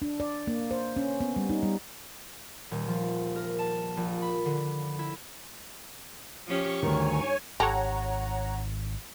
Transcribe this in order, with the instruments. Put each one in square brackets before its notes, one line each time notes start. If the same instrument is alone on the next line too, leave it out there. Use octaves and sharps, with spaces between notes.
[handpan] D4
D5
A#3
C5
C#4
B3
G3
D#4
G3
[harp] D#1
F3
A#4
A5
A#1
B5
D3
E4
[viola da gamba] F3 C#4 G4 [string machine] C#6
[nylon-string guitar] D2 D#3 [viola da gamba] G2 [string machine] C#5 G#5
[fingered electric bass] G#1 [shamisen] G4 A4 [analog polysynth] C#5 F#5 A#5